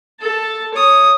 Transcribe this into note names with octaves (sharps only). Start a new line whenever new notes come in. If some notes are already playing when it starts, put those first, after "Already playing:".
A4 A5
C#5 D#6